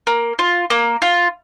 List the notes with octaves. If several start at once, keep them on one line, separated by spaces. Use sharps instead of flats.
A#3
F4
A#3
F4